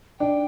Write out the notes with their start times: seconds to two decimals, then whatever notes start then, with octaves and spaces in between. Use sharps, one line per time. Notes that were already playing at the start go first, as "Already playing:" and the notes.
0.19 D4 G5